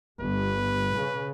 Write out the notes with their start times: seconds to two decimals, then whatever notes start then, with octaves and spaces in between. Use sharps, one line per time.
0.20 G1 B4
0.97 C#3